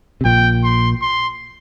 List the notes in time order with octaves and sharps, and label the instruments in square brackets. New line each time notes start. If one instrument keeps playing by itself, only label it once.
[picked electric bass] C3
[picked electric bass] A#1 A#2 [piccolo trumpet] G5
[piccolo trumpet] C6
C6